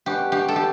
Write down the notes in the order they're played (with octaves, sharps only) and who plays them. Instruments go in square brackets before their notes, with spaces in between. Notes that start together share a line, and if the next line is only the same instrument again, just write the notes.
[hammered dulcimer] B2 G3 C#4 F#4 [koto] G4
[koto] G4
A4
G4